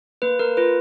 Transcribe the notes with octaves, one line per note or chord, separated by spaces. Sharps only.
A#3 B4
A#3 A#4
F4 B4